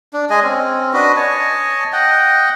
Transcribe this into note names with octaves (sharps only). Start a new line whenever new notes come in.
D4
G#3 G#4 D#5 G#5
C4 C#4
D4 F#4 B4 D#5
C#5 D#5 G#5 A5
D#5 F#5 G5